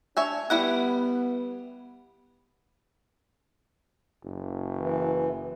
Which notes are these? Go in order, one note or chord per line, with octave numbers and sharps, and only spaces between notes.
D4 C#5 E5 G#5
G3 B3 E4 F#5
F#1
E3